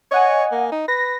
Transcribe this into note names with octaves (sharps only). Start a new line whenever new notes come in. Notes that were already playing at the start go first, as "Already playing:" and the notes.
C#5 D#5 F#5 G#5
A#3
D#4
B4 A#6